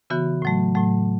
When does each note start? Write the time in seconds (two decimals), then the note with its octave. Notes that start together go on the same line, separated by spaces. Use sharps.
0.10 C#3 E3 B3 F#4
0.42 A2 F#3 A3
0.75 A2 F#3 A3